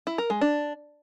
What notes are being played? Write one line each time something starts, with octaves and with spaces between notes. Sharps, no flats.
E4
A#4
G#3
D4